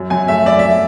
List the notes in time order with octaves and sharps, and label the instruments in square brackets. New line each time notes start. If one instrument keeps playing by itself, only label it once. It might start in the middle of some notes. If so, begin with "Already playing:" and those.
Already playing: [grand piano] F#2
F#2 G#5
A3 E5
F#2 D5
E5